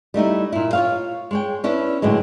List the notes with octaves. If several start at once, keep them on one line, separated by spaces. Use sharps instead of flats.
G3 A3 D#4 E4
A#2 E4
F4 C#5 F5
G#3 C#5 G5
C#4 D4 E4 B4
A2 D3 F#3 G#3